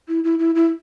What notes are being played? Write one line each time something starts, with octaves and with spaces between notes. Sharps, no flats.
E4
E4
E4
E4